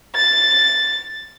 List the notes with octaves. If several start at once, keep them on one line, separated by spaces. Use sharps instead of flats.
A6